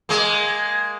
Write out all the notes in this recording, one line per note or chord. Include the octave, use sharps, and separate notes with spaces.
G#3 A#3